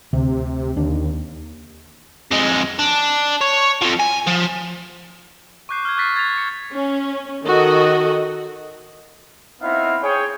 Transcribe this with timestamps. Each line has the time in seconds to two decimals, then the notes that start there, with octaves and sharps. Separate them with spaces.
0.13 D2 C3
0.77 D#2 D4
2.31 F2 G#3
2.79 D4
3.41 C#5
3.82 F2 F3
4.00 G#5
4.27 F3
5.69 C#6 D6 F#6 G6 C7
5.85 F6 G#6
5.97 C#6 D#6 F#6 A6 B6 C7
6.16 G#6 A6 B6 F7
6.38 C#7
6.72 C#4
7.44 D#3 F#4 A4 D#5
9.62 B3 C4 D#4 E4 E5 F5
10.02 G#4 C#5 G5